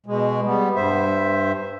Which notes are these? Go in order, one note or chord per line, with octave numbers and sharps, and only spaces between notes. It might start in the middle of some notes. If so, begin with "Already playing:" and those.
B2 G#3
G3 B3
G2 C5 E5